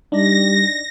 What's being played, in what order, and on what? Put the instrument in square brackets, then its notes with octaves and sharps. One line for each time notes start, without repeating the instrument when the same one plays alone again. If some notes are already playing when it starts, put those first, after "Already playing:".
[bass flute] G3 [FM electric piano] D4 D#4 D5 [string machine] A#6